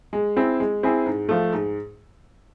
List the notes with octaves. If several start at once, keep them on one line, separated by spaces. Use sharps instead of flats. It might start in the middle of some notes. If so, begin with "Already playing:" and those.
G#3
C4 E4 G#4
G#3
C4 E4 G#4
G#2
F3 A3
G#2